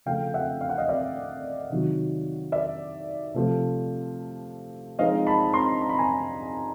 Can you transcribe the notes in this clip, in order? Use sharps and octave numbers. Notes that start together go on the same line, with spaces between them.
C#3 F3 A3 F5 G5
E5 F#5
F5
F#5
D#5 F5
D5 E5
C3 D#3 F#3
D5 E5
C3 F3 A3
F3 G#3 C4 D#4 D#5 F5
A5 B5
A#5 C6
A#5
B5
G#5 A#5